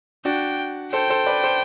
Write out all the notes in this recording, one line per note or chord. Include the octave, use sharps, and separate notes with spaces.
D4 F#4 G5
A4 C5 G5
A4 C5
B4 D5
A4 C5